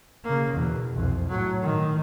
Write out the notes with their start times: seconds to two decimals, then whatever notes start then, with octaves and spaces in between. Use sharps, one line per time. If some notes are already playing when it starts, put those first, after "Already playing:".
0.24 C#3 A#3
0.53 E2 B2
0.93 C2 F2
1.28 A2 F#3
1.61 A2 D#3